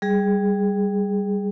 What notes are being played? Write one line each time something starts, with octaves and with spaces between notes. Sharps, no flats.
G3 G#4